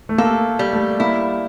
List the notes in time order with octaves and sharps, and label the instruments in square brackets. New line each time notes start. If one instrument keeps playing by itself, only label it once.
[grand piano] A3
[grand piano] A#3 [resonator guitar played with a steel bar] A4
[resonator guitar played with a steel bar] G3
[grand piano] A3
[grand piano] A#3 [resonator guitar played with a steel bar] E4